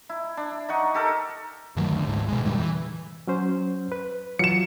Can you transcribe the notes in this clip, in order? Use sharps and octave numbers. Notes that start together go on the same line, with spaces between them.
E4
D4
D#4 F#5 C#6
G4 A4 A#4
G2 D#3 F#3 A3
D2
D2 G#2
B2 G#3
F2 A#2 D3 G3
E3
F#3 C#4 C5
B4
E3 F#3 F4 C#7 E7